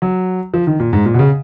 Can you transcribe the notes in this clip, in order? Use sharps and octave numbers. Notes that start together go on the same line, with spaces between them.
F#3
F3
D#3
A#2
G#2
A#2
B2
C#3